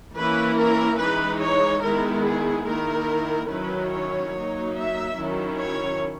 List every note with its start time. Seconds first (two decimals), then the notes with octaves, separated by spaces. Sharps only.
0.16 E3 A#3 C#4 E4 B4
0.58 A#4
0.99 E3 G#3 D#4 B4
1.42 C#5
1.84 D#3 G#3 B3 E4 A#4
2.25 G#4
2.67 D#3 A#3 E4 A#4
3.50 D#3 F#3 C#4 E4 B4
3.92 C#5
4.34 F#3 A#3 D#4
4.76 E5
5.18 D#3 F#3 C#4 E4
5.59 C#5